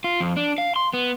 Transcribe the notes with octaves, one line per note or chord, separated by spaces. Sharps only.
F4
F2
D4
F5
C6
B3